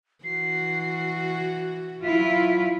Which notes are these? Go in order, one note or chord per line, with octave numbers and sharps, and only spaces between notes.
E3 F#4 C7
F#3 E4 F4 B6